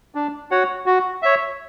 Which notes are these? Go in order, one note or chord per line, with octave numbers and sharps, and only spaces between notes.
D4
F#4 C#5 F#5
F#4
C#5 E5